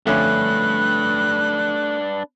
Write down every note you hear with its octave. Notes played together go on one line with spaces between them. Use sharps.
F2 D3 A3 C#4 D4 B4 F#6